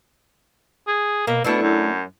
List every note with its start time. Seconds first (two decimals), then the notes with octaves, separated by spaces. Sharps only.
0.88 G#4
1.27 B2 A#3
1.44 B2 A3 D4 E4
1.62 F#2